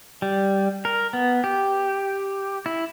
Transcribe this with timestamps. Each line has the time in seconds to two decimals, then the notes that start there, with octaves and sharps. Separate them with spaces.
0.22 G3
0.85 A#4
1.13 B3
1.44 G4
2.66 E4